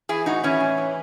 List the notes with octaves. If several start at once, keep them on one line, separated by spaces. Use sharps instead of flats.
E3 E4 G#4
A2 D#4 F#4
E3 C#4 E4
A2
E3